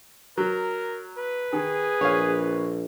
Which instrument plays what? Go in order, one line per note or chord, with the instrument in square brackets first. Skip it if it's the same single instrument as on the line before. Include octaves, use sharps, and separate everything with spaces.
[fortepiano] F#3 [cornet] A#4
[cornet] B4
[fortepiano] D#3 [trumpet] G#4
[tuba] A#1 [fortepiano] C#5 F5